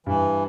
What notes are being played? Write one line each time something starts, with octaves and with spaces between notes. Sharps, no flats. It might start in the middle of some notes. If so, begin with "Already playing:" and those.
G2 E3